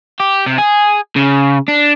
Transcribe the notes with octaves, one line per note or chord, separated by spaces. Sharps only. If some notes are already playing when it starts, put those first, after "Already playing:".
G4
C3
G#4
C#3
D4